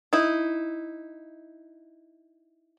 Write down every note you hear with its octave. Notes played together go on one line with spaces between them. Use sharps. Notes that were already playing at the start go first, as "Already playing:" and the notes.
D#4 E4